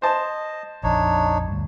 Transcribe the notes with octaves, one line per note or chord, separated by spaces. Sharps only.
C5 D#5 A5
A#1 F2 D4 D#4 C#5
D2 G2